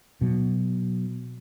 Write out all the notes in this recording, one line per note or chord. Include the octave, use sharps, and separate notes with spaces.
B2 F#3